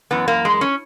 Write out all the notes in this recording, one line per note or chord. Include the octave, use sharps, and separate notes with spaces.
F#2 E3 B3
A#3
G#3
C#4